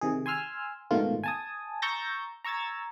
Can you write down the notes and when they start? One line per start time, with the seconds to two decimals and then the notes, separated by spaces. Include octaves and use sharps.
0.01 C3 D#3 G#4
0.26 G#5 C6 E6 F6
0.91 G#2 B2 D#3 A3 F4
1.24 G#5 A5 D#6
1.82 A#5 C#6 E6 G6 A6 A#6
2.45 A#5 C#6 E6 G#6 A6